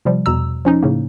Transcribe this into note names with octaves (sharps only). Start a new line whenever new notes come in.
C3 F3 G3
E2 B2 A#5 E6
F3 C#4 D#4
A2 C#3 A#3